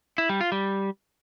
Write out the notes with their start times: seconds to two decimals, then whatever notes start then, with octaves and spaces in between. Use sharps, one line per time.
0.18 E4
0.29 G3
0.41 F4
0.52 G3